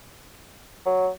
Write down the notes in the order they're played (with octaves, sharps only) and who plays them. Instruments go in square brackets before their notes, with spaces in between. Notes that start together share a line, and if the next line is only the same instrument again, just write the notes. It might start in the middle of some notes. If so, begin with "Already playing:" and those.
[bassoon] F#3